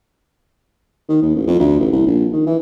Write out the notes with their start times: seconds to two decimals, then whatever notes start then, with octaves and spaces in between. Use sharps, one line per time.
1.09 D#3
1.23 D#2
1.35 A1
1.47 F2
1.60 D2
1.79 A1
1.92 C2
2.07 A#1
2.33 D#3
2.47 E3